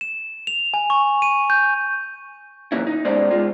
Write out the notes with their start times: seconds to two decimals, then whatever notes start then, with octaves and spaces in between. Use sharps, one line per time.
0.01 E7
0.47 F7
0.74 G#5
0.90 C#6
1.22 D#7
1.50 G6
2.72 C3 E3 F#3 A#3 C#4 E4
2.87 D#4
3.05 B2 G#3 C#4 D#4 C5 D5
3.31 G#3 F4